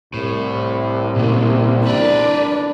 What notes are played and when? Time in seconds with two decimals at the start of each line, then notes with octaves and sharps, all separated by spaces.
0.14 C2 A2
1.16 A#2 C#3
1.86 D4 A#4 B4 D5